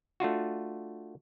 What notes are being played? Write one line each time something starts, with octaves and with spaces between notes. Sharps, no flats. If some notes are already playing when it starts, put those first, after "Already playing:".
A3 D4 F4 F#4